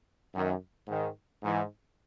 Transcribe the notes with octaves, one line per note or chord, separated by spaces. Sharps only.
F#2 D#3
G#2 D#3
G#2 E3